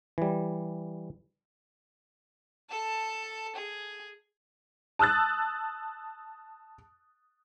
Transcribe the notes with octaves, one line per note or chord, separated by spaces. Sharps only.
E3 G3
A4 A5
G#4
A5 D#6 E6 F#6 A6